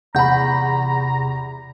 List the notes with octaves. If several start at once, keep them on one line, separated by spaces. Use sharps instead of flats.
E2 C3 F#5 A#5 B5 G6